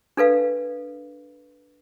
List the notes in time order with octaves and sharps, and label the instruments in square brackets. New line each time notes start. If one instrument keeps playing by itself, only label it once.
[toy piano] D4 A4 B4 F5